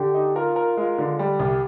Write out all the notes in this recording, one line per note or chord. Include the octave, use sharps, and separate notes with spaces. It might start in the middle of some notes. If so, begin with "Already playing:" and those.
Already playing: D3 G4
D#4
F4 A#4
A#4
G#3 F4
D3
G3 G4
C2